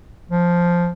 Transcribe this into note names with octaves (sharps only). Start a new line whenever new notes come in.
F3